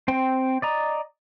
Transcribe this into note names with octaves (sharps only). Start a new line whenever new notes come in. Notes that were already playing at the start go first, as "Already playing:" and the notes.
C4 C5 G5
D5 D#5 A#5